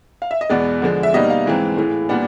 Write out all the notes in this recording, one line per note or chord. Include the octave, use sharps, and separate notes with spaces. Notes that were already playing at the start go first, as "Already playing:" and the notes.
F5
E5
D#5
E2 B2 G#3 B3 D5
D3 F3 G#3
E5
B2 G3 A#3 D#4 D#5
F5
G#2 E3 G#3 C4
A2 E3 G#3
A#2 G3 B3 D4 F#5